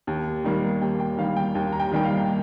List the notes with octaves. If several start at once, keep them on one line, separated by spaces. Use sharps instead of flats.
D#2
D#3 G3 A#3
D#2 G5
G5
D#3 G3 A#3 F5
G5
D#2 G5
A#5
G5
D#3 G3 A#3 G5
F5